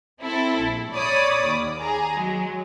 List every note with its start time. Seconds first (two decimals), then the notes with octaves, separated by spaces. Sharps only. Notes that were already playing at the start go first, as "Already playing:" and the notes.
0.19 C4 E4 A4
0.60 A#1
0.94 C#5 D5 B5 D6 D#6
1.47 D#2
1.79 G#4 A#5
2.18 F#3 G#3